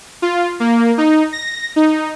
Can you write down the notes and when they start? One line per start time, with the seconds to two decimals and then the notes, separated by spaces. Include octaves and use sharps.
0.22 F4
0.60 A#3
0.98 D#4
1.33 A#6
1.76 D#4